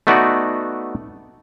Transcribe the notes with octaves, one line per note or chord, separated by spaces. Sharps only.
A3 B3 D#4 F#4 D5